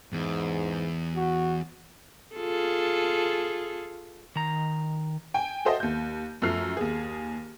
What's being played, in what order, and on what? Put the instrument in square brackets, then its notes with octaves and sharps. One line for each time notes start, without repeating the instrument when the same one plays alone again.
[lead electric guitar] E2 [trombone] G#2
[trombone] F#4
[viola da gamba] F4 G#4 A4
[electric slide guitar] D#3 A#5
[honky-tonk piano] G5 G#5
F#4 A4 C5 D#5 E5
D#2 G6
F#2 F3 A3 F6 C7
D#2 G#4